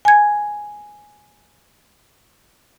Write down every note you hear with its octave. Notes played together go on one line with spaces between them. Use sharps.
G#5 G#6